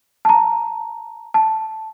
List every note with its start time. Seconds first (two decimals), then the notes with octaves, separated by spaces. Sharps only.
0.25 A5 A#5
1.34 A5